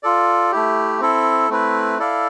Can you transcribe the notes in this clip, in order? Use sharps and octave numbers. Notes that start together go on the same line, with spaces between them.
F4 A4 D5
A3 E4 G4
C4 E4 A4
A3 C4 E4 B4
E4 A4 D5 F5